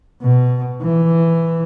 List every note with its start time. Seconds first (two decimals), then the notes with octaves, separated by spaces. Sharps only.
0.22 B2
0.81 E3